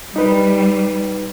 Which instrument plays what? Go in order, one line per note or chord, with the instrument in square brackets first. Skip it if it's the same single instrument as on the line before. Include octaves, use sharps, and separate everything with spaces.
[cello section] G3 [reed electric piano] D#4 B4